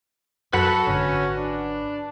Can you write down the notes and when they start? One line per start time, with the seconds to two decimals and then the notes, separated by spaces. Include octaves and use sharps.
0.53 F#2 F#4 A4 B4 F#5 B5
0.87 G#1 D3 C#4
1.36 D4